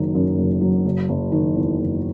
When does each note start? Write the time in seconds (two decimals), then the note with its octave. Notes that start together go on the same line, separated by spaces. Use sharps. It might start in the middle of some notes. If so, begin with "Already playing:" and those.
Already playing: F#1 D#3 F#3
0.15 F#2
0.38 F#1
0.61 F#3
0.85 F#1
1.09 F#1
1.32 D#3
1.55 E2
1.79 F#1